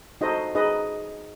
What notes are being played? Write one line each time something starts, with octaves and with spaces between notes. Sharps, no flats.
D#4 F#4 A4 C5 D#5
D#4 G#4 B4 D#5